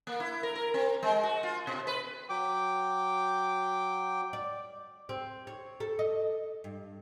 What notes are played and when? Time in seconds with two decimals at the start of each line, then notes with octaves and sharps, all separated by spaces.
0.07 A#3
0.20 E4
0.43 A#4
0.56 A#4
0.74 C4
1.03 G#3
1.23 F#4
1.43 F4
1.67 B2
1.87 B4
2.29 F#3 G5 D6
4.33 D5
5.09 C4
5.47 C#5
5.80 A4
5.99 D#5
6.64 G2